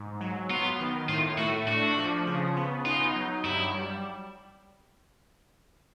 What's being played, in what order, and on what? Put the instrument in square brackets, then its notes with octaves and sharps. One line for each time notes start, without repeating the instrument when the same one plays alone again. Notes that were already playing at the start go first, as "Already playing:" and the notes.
Already playing: [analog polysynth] G#2
F#3
[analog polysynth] B3 [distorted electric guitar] F4
[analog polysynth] D#3
[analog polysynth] A2 [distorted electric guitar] F4
[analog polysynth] A3 [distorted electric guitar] F#4
[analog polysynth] D4 [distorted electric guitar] F#4
[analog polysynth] F3
C#3
B3
[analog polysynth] D#4 [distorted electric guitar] F4
[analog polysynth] F#3
[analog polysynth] G2 [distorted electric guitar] E4
[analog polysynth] G3